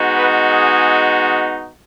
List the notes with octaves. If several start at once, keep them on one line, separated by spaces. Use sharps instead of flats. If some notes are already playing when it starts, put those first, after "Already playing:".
Already playing: G#3 B3 D#4 F#4
B4
G#4